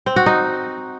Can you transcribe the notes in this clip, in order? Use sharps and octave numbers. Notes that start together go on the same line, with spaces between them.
C4
F#4
D#4